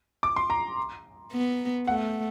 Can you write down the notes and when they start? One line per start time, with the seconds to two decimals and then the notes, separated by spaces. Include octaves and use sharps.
0.23 D6
0.36 C6
0.50 A#5
1.32 B3
1.87 A3 F#5